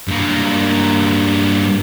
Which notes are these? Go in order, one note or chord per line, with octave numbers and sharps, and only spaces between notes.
G2 A#3